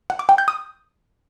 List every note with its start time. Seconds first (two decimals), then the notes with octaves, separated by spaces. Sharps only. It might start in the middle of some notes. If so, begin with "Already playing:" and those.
0.10 F#5
0.19 D6
0.29 G5
0.38 G6
0.48 D#6